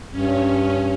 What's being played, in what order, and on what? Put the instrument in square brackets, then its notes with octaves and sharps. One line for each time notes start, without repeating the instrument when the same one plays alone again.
[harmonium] G2 [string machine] C#4